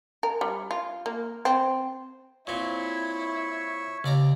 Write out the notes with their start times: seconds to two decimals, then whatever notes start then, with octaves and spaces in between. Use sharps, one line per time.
0.23 A#4
0.41 G3
0.71 F4
1.06 A#3
1.45 C4
2.47 A#2 C4 E4 C#5 E5 C#6
4.04 D#2 C#3 D5 A#5